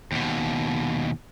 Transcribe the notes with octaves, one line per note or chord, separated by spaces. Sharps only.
D#2 B2